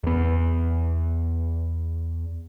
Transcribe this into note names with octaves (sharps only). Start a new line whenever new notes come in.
E2 B3